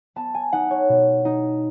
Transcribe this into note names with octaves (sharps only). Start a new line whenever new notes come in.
B3 A5
G#5
D#4 F#5
C#5
B2
D#4